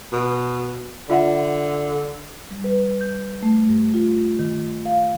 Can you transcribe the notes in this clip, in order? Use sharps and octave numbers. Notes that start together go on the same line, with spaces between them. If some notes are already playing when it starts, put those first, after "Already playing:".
B2
D3 F4 E5 F#5
G3
B4
G6
A3
G2
F4
D#3
F5